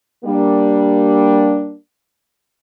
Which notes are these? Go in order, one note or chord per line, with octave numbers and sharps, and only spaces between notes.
G3 A#3 D4